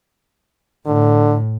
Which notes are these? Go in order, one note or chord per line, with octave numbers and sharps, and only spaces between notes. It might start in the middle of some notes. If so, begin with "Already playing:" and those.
A2 D3